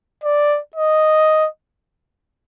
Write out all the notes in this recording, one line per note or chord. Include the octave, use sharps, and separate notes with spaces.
D5
D#5